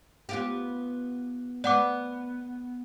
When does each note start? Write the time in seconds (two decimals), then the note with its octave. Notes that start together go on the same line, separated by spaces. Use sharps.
0.29 B3 F4 G4
1.64 B3 D5 F#5 D6